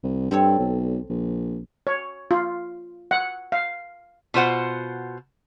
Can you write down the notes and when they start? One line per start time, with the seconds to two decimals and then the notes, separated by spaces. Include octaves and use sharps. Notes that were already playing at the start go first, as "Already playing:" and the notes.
0.03 C2
0.31 G2 C4 A4 C#5
0.59 B1
1.09 A#1
1.87 C#5
2.31 F4
3.11 F#5
3.52 F5
4.34 B2 F4 C5 F#5